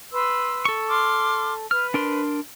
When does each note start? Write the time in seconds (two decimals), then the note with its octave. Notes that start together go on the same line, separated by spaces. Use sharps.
0.12 B4 C6 E6
0.65 A4 C#6
0.90 C6 D6 F6
1.71 B4 F6
1.94 D4 A#4 C6